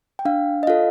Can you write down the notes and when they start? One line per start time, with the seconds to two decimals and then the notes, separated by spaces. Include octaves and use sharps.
0.19 G5
0.25 D4 F5
0.63 D#5
0.67 F4 A4 F5